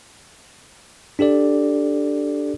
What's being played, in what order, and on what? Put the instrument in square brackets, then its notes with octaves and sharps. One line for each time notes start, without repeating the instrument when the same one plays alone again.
[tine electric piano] D4 G4 A4 D5